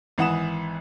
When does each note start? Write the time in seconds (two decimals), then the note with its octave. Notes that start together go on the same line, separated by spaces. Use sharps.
0.18 G#1 E3 F#5 D#6 E7